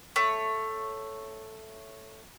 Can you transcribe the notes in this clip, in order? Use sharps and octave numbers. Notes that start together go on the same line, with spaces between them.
A3 C#5